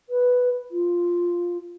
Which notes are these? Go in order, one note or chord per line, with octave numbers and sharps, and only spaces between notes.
B4
F4